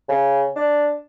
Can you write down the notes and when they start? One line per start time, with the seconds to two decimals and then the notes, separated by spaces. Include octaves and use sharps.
0.09 C#3
0.56 D4